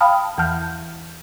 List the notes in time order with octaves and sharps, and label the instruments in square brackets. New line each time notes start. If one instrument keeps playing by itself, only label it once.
[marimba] F5 G5 A5 B5 D#6 F6
E2 E3 F#5 A5 F6 G6